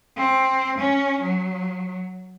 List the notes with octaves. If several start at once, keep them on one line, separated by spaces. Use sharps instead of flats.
C4
C#4
F#3